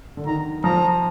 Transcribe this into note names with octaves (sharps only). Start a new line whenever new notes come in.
D3
D#3 A#5
F3 A#5